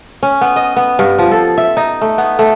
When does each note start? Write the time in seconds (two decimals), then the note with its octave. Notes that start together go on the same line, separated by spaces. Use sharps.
0.23 C#4
0.41 B3
0.56 D#5
0.76 B3
0.99 G2
1.19 F3
1.31 A4
1.58 E5
1.77 D#4
2.01 A3
2.18 B3
2.39 A3